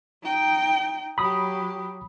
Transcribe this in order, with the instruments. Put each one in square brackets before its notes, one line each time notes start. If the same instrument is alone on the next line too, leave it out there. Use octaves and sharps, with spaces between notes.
[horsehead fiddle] D#4 G5
[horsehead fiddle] F#3 G4 [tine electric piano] B5 D#6